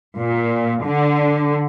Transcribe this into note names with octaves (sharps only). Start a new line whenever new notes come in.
A#2
D3